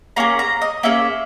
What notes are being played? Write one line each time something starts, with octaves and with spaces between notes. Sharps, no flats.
A#3 C#4 G#4 A#5
A#5
D#5
A#3 C#4 G#4 E5